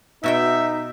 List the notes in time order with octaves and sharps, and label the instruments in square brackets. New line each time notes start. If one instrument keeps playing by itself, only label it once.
[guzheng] B2 F#4 G5 [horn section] B3 E5 [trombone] D#4